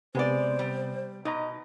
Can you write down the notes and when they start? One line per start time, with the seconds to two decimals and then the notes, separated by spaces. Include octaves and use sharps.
0.15 C3 G#3 B3 C5 D5
0.59 G3
1.25 B2 D#4 D#5 A#5